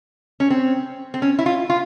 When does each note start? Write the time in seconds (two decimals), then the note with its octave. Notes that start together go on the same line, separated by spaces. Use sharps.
0.40 C#4
0.50 C4
1.14 C4
1.22 C#4
1.39 E4
1.46 F4
1.70 F4